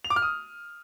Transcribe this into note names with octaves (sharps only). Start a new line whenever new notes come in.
F7
D6
F6
D#6